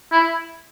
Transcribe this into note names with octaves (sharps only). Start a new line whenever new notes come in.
E4